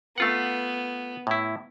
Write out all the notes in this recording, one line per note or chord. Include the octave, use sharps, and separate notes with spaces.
A3 B3 F4 F#5
A2 E4